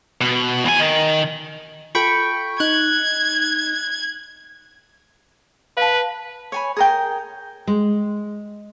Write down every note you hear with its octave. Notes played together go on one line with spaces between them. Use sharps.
B2
E2 G#5
D#3
F4 A4 G5 B5 C#6
D#4 F#6 G#6
B4 F5 A5
C#5 G#5 B5
G#4 A#4 G5
G#3